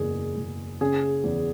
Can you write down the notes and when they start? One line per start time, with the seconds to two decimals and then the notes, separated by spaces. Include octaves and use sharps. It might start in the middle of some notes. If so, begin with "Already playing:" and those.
Already playing: F#1 E2 G#4
0.37 F#1
0.81 C#3 G#4
1.24 E2